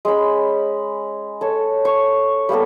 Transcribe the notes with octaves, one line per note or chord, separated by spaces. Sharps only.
G#3 C#4 B5
A4 C#5
C#6
G3 A#3 B3 A4